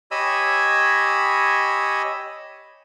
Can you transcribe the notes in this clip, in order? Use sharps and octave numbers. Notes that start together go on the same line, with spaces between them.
G4 C#5 D#5 G#5 B5 E6